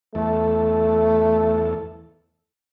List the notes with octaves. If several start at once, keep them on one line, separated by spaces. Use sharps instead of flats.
E2 A3 A4